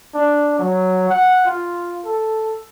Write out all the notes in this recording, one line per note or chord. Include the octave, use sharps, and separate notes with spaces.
D4
F#3
F#5
F4
A4